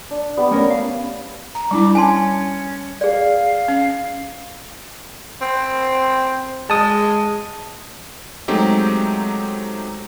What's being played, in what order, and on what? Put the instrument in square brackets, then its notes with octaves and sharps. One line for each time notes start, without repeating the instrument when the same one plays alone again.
[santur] D4
G3 B3
[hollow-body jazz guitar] A3 C#4 A#4
F5
[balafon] A#5
[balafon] G3 D4 E4 [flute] D6
[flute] C#4 [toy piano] G#5 A5 C6
[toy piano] G#4 D5 [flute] F5
[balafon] C#4
[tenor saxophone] C4
[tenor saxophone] G#3 [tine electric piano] A5 D#6
[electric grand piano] F#3 G#3 A3 C4 D#4 G4